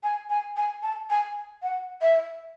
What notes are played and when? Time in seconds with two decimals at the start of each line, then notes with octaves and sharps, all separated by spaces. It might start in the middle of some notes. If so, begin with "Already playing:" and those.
0.03 G#5
0.29 G#5
0.56 G#5
0.82 A5
1.10 G#5
1.62 F#5
2.02 E5